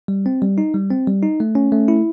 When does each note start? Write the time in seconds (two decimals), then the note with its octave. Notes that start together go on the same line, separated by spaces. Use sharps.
0.08 G3
0.26 C4
0.42 G3
0.58 D#4
0.74 G3
0.91 C4
1.07 G3
1.23 D#4
1.40 A3
1.55 C#4
1.72 A3
1.88 E4